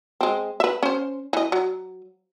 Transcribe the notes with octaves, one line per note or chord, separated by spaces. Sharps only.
G#3 C4
B4 E5
C#4 C5
E3 D#5
F#3